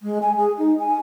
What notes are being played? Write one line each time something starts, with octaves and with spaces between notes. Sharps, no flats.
G#3
G#5
G#4
D#4
G#5